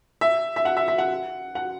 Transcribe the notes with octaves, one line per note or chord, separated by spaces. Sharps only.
E5
E5
F#5
E5
E5
F#5
F#5